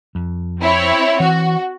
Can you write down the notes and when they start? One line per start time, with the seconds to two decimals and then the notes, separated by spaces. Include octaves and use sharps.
0.15 F2
0.61 C4 E4 C#5
1.20 E3 F#4